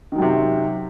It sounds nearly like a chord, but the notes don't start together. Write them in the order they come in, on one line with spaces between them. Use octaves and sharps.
D#3 F#3 F#2 C3